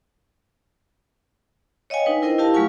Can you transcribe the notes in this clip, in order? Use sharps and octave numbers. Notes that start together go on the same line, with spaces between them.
C#5 D#5 F5 G5 G#5
D4 D#4 B4
E4 A#4 C5 D#5 G5
E4 G4 A#4 F5 A5
F#3 A3 F4 F5 G#5 C#6